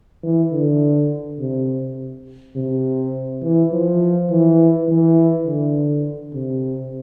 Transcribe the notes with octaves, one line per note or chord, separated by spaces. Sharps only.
E3
D3
C3
C3
E3
F3
E3
E3
D3
C3